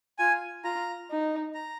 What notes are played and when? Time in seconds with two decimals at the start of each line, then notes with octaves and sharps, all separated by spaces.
0.19 F4 G#5
0.64 F4 A#5
1.10 D#4
1.54 A#5